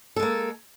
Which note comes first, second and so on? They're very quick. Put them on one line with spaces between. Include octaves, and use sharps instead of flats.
A4 G#3 A#3